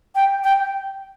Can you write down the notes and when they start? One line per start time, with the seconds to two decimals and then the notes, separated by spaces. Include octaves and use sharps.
0.15 G5
0.44 G5